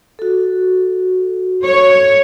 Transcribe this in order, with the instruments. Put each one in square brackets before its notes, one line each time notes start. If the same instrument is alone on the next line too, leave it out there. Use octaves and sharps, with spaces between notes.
[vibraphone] F#4 A4
[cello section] C#5